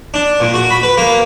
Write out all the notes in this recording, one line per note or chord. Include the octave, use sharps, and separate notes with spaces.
D4
A#2
F#4
B5
B4
A#3